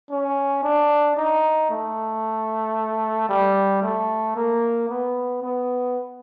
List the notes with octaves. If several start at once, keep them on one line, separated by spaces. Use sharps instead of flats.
C#4
D4
D#4
A3
G3
A3
A#3
B3
B3